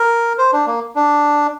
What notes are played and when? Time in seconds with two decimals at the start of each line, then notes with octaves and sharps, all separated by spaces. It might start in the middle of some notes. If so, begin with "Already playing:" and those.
Already playing: A#4
0.38 C5
0.53 D4
0.67 A#3
0.95 D4